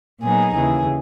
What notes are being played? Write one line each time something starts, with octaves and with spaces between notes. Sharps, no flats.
A#2 F#3 B3 D#4 G#4
D#2 C#3 E3 G#4